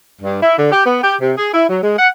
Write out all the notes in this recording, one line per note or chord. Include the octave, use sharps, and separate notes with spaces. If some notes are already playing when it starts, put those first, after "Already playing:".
G2
E4
D3
G4
B3
G4
C3
G#4
E4
F#3
G#3
F#5